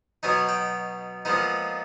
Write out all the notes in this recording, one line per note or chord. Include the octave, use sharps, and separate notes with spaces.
B2 F#3 B3 D#4 G#5
G5
A#2 F3 G#3 B3 D#4